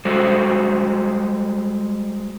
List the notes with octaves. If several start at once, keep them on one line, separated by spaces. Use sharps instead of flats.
G3 G#3 F#4 A4 C5